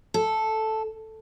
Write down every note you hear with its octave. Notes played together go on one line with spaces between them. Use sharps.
A4